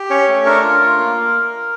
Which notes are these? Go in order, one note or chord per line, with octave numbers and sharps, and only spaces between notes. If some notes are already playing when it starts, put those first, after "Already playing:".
Already playing: G4
C#4 C#5
A3
D4 A#4
F4
F4
A#3